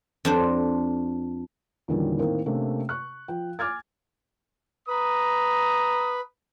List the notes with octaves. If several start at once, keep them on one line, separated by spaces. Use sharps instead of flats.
F2 D4 C5
E2 A#2 D3 D#3 G3 C#4
A2 D#3 A#3 C4
C3 A3 A#3 C#4 D4
C#6 F#6
F3 G5
G#5 D6 F6 G#6 A6
B4 A#5 D#6